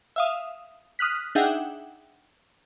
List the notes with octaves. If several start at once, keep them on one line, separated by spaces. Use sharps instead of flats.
E5 F5 D#6
D#6 F6 F#6 B6
D4 D#4 G#4 E5 F#5 G5